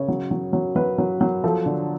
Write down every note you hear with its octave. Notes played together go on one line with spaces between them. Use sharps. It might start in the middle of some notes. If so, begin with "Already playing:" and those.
Already playing: C#3 C#5
F#3
F#3
F#3
F#3 B4
F#3
F#3
F3 A4
D3